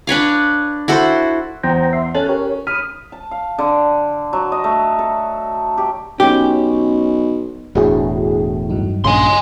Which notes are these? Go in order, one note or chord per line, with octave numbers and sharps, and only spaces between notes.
D4 B4 C#5 F5
E4 F#4 A4 C5
E2 C5 G5 A#5
E5 C6
C#4 A4 F#6 A6
G4 A#4 C#5
B5 D#6 F6
A5
F5
D3
F#3
D#5
A3
A4
G4
B1 C#4 G4
E1 A2 D4 F#4 G#4
G2 F#3 D#4
A#1 C#3 G#5 C6